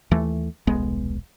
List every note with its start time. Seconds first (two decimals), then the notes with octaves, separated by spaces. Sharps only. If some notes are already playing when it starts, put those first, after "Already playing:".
0.11 D#2 E3 A3
0.67 D#1 B1 G#3 B3